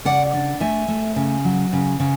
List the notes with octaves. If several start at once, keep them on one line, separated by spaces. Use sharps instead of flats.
C#3 D5 F#5
D4
A3 E5 G#5
A3
C#3
F#3
C#3
C#3